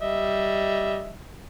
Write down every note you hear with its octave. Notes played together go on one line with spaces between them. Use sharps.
G3 D#5 E5